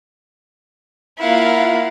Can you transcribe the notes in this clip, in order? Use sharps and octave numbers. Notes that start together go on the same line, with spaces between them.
A#3 E4 F4 F5 F#5